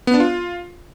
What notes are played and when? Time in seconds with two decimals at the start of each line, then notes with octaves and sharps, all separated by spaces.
0.07 B3
0.14 D4
0.20 F4